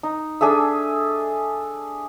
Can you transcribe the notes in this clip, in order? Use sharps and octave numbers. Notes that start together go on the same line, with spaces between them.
D#4
D4 G#4 A4 E5